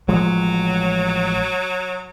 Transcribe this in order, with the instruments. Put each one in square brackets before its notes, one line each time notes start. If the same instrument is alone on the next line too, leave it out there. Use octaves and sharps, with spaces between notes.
[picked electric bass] A1 F3 G#3 [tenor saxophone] F#3